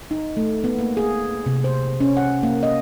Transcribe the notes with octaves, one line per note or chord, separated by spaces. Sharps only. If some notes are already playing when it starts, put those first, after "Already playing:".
D#4
A3
B3
A#3
G#4
C3
C5
C#4
F#5
A#3
D#5